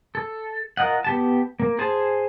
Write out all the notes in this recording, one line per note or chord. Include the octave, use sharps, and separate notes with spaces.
A4
F4 A#4 D#5 F#5
B3 G4 A5
A#3
G#4 C5 G#5 A5